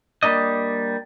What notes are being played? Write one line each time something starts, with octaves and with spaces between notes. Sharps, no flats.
G3 A#3 D4 D#5